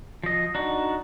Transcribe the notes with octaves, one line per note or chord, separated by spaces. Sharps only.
F3 D#5
D4 D#4 F#4